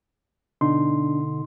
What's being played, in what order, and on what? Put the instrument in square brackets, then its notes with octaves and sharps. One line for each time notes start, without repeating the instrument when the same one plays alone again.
[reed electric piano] B2 D#4 C6 [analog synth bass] D3 [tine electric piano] D4